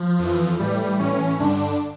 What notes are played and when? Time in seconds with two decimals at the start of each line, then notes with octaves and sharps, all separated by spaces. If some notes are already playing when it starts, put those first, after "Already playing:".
Already playing: F3
0.19 F2 E3
0.59 A2 E3 G3
0.99 A2 E3 C#4
1.40 G2 D3 D4